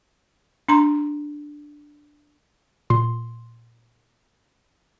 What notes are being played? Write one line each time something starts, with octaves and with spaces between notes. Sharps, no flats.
D4 A#5 C6
A#2 C6